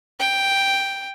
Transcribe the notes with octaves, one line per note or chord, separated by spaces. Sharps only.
G5